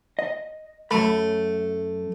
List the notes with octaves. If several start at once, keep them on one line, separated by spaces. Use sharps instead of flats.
D#5
F#2 A3 B5